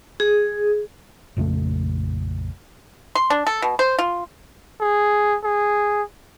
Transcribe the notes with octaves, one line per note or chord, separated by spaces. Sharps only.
G#4
A#1 F2 C#3 A3
C6
D4
A4
B2
C5
F4
G#4
G#4